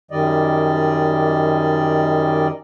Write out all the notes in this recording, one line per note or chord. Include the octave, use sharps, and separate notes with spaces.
F#2 D#3 G3 D5 D#5